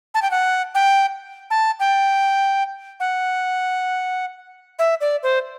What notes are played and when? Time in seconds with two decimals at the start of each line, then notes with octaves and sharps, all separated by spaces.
0.14 A5
0.22 G5
0.31 F#5
0.75 G5
1.50 A5
1.80 G5
3.00 F#5
4.79 E5
5.01 D5
5.23 C5